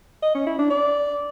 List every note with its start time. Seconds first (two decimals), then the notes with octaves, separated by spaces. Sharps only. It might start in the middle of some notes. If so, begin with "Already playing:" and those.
0.23 D#5
0.35 C#4
0.47 E4
0.59 D4
0.71 D5